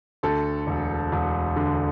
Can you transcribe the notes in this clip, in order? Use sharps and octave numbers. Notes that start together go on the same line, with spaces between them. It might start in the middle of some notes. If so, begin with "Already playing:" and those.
D2 A4
E1
E1
D3